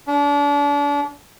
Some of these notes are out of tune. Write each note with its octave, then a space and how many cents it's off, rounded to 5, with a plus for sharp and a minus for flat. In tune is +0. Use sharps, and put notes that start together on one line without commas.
D4 -35